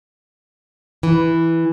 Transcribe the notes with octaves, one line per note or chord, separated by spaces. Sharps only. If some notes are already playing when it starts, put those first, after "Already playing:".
E3